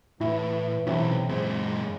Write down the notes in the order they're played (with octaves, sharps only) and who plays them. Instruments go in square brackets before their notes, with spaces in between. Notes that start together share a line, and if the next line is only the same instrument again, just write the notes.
[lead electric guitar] A2 [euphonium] E3 [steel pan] E4
[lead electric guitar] B1 [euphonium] C3 [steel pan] E3 C#4 E4
[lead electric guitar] F#2 A#2 [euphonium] G#3 [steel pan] C4